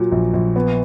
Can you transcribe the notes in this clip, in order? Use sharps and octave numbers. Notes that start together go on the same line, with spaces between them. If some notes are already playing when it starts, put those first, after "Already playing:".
Already playing: A#2 F#3
A#1
A#1
B3